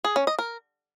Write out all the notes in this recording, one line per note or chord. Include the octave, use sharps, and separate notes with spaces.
G#4
C#4
D#5
A#4